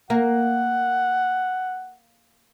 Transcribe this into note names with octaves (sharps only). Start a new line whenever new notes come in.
A#3 F#5